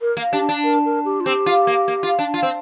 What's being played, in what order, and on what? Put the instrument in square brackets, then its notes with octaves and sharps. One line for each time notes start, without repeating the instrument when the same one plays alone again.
[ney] A#4
[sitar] A#3
[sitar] D4 [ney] G4
[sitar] D4
[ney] A#4
A#4
G4
F4
[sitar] C4 [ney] G4
[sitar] F4
A#3
A#3
F4
D4
F4
C4